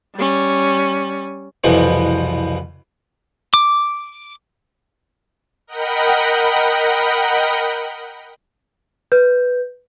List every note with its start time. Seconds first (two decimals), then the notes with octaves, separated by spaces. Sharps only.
0.16 G3 C#4
1.64 C2 F2 B2 E3 B3
3.54 D6
5.67 A#4 D#5 F#5 G5 B5
9.12 B4 G6